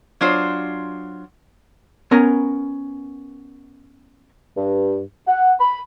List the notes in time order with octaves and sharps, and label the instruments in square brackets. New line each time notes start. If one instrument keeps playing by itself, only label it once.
[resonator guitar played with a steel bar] F#3 D4 F4 C5
[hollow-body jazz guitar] B3 C#4 A#4 G#5 A#5
[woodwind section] G2
F#5
B5